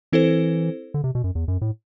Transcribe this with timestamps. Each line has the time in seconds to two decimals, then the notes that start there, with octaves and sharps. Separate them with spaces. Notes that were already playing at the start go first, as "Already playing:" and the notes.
0.12 E3 C4 E4 A4 C5
0.94 D3
1.04 C3
1.15 B2
1.24 F#2
1.35 E2
1.48 F#2
1.61 A2